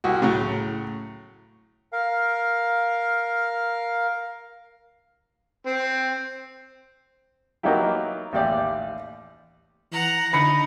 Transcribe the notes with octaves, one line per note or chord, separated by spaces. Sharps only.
C2 F#4
A2 C#3 F#3
A#4 F5
C4
F#3 A#3 B3 D#4 E4 G4
A1 D#2 G4 D5
E3 F#5 A#5
D3 D#4 B5 C#7